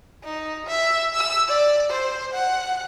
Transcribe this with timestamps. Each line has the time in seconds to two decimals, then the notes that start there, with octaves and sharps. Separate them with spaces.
0.24 D#4
0.67 E5
1.16 E6
1.48 D5
1.90 C5
2.34 F#5